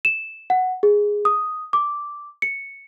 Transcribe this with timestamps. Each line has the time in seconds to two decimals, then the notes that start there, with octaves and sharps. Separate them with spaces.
0.05 E7
0.50 F#5
0.83 G#4
1.25 D#6
1.73 D6
2.42 C#7